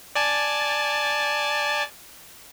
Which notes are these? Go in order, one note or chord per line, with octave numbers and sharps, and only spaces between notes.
D5 G#5 A5